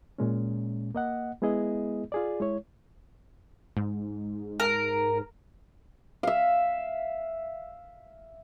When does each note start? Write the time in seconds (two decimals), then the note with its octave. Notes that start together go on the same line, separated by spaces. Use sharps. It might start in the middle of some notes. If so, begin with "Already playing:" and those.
0.18 A#2 G#3 C#4
0.95 A#3 D#5 F#5
1.42 G#3 B3 E4 G#4 D#5
2.12 F4 G#4 D5
2.40 G#3 E4 C#5
3.77 G#2
4.60 A#4
6.23 E5 F5